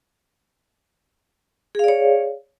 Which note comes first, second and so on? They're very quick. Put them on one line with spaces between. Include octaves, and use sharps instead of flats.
G#4 F5 D5 C#5